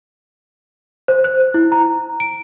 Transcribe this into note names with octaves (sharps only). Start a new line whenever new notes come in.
C5
F#6
E4
A#5
D7